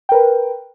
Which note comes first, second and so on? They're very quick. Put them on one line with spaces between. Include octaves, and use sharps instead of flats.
G5 A#4 B4